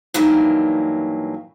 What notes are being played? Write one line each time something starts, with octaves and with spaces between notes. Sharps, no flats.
G2 D#3 E3 F#3 A#3